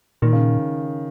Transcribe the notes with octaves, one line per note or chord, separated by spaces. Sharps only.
A#2 D#3
C#3